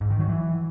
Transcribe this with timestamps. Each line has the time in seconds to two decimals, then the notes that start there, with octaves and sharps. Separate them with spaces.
0.01 G#2
0.10 D#3
0.20 F#3
0.29 E3